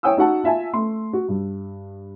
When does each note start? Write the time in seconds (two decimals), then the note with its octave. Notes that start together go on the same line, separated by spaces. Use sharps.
0.03 E4 C#5 G5 G#5 D#6 E6
0.17 D#4 F#4 F#5 A5
0.44 F4 E5 G#5 A5
0.73 A3 C6
1.13 F#4
1.28 G2